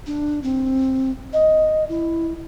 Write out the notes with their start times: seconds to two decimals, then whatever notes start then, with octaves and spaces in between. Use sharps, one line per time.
0.07 D4
0.43 C4
1.33 D#5
1.89 E4